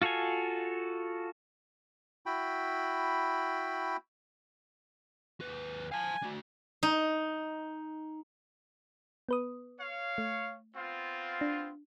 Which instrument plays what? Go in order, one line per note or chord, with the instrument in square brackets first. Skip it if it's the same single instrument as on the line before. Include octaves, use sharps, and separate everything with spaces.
[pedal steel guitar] F4 F#4 A4 F5 G#5
[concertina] E4 F#4 G5 B5
[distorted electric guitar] D#2 B4
[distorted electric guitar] F5 A5 [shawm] G#5
[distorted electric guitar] D4 F#4
[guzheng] D#4
[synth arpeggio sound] B3 B4 D#6
[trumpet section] C#5 F5
[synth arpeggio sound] A3
[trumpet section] B3 C4 F4
[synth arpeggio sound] D4